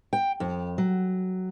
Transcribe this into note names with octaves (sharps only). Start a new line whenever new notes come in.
G5
F2
F#3